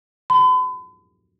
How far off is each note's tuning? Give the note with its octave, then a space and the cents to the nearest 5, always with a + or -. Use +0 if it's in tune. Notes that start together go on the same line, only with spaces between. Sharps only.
B5 +40